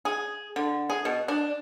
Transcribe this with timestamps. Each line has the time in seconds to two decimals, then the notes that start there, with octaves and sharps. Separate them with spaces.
0.05 G#4
0.56 D3
0.90 G#4
1.05 B2
1.28 D4